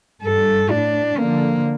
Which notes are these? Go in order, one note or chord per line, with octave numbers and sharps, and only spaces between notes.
G2 A4
A2 D4
D3 F3 A#3